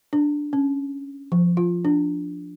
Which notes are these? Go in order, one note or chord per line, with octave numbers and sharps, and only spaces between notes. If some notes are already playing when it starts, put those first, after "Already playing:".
D4
C#4
F3
F4
D4